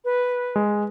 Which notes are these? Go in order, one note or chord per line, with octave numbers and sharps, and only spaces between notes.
B4
G#3